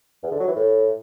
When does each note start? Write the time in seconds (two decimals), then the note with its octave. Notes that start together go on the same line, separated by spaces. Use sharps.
0.23 E2
0.31 D3
0.40 F#3
0.48 E3
0.56 A2